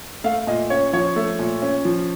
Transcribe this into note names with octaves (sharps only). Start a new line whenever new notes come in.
A3 F5
A#2 D#5
C#4 C#5
F3 C#5
A3
A#2
C#4
F3